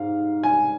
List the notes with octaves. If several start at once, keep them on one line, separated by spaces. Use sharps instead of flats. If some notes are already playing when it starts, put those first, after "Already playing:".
Already playing: G#2 F5
G#5